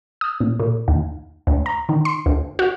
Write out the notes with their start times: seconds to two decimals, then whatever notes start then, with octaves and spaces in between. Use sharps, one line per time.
0.21 D#6
0.40 A#2
0.60 A#2
0.88 D#2
1.47 D2
1.66 A#5
1.89 D#3
2.05 C6
2.26 D2
2.59 F#4